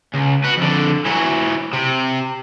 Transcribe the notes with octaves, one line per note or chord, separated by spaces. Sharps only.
C#2
F#4 B4
F2 D3
E3 F#3
C3